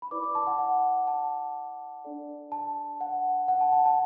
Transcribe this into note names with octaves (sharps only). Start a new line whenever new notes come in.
B5
E4 B4 D5 D6
D6
A5
F#5
F#5
A5
D4 A4 D5
A5
F#5
F#5
A5
A5
A5